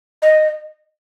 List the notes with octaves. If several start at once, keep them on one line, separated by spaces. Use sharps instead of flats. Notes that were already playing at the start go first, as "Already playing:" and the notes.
D#5